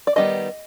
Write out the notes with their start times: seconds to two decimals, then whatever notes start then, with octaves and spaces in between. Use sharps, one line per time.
0.07 D5
0.16 D#3 G3 B3 D4 D#5